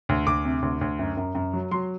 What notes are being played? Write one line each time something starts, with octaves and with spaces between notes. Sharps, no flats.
D2
D2 D6
C3
D2
D2
F#2
F#2
F#2
F#3
F#3 C6